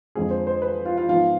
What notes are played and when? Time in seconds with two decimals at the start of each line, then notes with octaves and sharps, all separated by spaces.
0.15 F2 D3 F3 G#3 C4 G#4
0.31 C5
0.47 C5
0.62 B4
0.85 F4
0.97 F4
1.08 G#2 F3 B3 F4